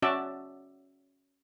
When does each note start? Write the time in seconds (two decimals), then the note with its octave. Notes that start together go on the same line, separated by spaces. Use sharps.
0.02 C#4 F#4 D5 E5 A5